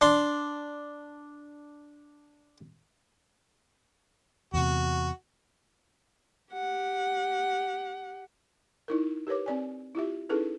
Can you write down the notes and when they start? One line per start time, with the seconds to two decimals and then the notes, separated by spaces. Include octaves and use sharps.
0.01 D4 C6
4.54 E2 C3 F#4
6.53 G4 F#5
8.88 D#4 E4 A#4
9.27 G4 A#4 B4 C#5 D6
9.46 C4 D5 G#5
9.95 E4 F4 G4 E5
10.29 C#4 D#4 E4 G#4 A4 B4